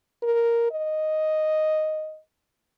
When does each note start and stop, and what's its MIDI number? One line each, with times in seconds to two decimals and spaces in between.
0.22 0.67 70
0.71 2.19 75